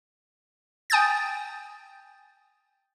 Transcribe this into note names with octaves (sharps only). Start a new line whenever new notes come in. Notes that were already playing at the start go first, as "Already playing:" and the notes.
G5 G#5 D#6 G6 A6